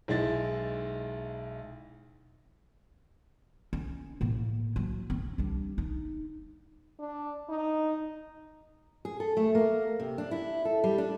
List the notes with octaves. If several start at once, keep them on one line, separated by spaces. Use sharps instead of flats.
B1 G#3 E4 A6
C#4
A2 A#3
F#3
C4
G3 D4
D#4
D4
D#4
G#4
A4
A3
A#3
C3
D4
E4
A4
G3
D4